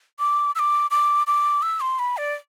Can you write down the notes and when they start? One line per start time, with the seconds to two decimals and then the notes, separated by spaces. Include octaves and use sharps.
0.19 D6
0.55 E6
0.59 D6
0.91 D6
1.27 D6
1.62 E6
1.81 C6
1.99 B5
2.17 D5